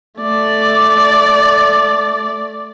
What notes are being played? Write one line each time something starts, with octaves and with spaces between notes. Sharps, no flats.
A3 D5